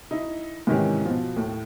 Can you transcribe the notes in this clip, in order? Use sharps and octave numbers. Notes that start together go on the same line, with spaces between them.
D#4 E4
G#2 C3 D#3 E3 C#4 G4
B2 F3
D#2 A2